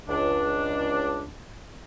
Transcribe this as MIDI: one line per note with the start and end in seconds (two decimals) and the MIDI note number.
0.08 1.28 37
0.08 1.28 62